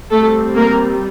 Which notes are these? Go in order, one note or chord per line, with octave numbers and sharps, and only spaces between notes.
G3 A3 C4 A4
A#3 A#4